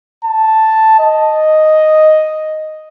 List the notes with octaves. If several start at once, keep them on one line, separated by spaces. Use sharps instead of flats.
A5
D#5